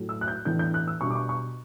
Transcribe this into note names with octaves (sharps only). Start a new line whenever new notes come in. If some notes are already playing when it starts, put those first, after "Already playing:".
Already playing: A2 F#3 A3
E6
F#6
G6
A2 E3 B3 D4 G6
G6
F#6
E6
B2 G3 D4 C#6
D6
C#6
C#6